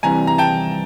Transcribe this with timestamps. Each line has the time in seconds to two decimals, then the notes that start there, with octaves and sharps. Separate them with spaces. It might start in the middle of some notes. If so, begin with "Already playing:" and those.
0.03 C2 C3 E3 G3 G#5 A#5
0.27 A#5
0.38 G5 A5